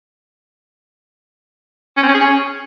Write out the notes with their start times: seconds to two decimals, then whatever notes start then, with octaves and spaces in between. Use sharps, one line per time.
1.97 C#4
2.03 C4
2.09 C#4
2.14 G#4
2.20 C#4